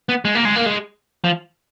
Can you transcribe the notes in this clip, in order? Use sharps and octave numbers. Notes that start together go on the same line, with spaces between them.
B3
G#3
A#3
G#3
A#3
G#3
F3